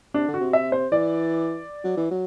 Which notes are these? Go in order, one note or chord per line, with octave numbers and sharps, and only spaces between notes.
C3 D4
D3
F#4
C3
E5
C5
E3 D5
F#3
E3
F#3